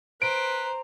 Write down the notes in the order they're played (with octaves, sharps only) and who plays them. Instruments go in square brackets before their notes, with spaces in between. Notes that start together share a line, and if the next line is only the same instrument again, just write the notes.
[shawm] B4 [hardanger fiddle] C5 [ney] A#5 [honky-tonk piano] D7